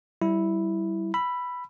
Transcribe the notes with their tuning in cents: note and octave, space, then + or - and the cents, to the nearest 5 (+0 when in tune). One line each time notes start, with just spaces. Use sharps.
G3 -25 E4 -5
B5 +0 E6 +25